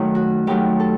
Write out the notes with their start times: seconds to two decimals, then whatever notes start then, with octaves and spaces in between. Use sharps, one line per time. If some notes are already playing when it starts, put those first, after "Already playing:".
Already playing: F#2 D#3 F#3 A3
0.15 F#4
0.47 F#2 D#3 F#3 A3 G4
0.80 A4